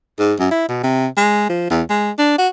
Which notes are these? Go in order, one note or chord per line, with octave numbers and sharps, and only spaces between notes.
G#2
F#2
E4
B2
C3
G#3
F3
E2
G#3
D4
F#4